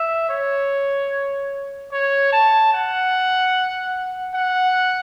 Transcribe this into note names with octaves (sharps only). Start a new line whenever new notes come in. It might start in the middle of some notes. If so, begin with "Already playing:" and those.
Already playing: E5
C#5
C#5
A5
F#5
F#5